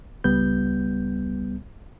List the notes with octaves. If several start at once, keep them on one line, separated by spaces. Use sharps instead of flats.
C#2 G3 B3 G6